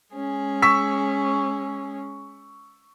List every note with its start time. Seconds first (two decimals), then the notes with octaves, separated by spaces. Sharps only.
0.13 G#3 C#4 G#4
0.62 C#6 E6 B6